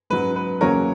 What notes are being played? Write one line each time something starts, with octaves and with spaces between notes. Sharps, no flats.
G#2 F#3 C#4 B4
B4
E2 C#3 F#3 A#3 C#4 A#4 C#5